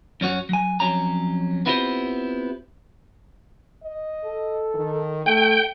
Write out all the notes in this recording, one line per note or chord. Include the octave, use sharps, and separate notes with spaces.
F#2 C#4 F#4 C#5
F#3 G#5
F2 F#3 C#4 A#5
B3 C4 E4 F4 G4 C5
D#5
A4
D#3
A3 A4 G5